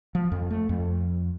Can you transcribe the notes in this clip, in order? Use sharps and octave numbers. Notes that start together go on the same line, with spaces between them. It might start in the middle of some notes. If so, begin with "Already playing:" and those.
F3
F2
A3
F2